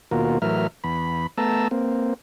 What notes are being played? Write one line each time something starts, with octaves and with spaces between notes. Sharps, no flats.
D#2 B2 A#3 F4 F#4 A#4
A2 E3 F#3 A#4 E5 F6
E2 B5
A3 B3 A5 A#5 E6
A#3 C4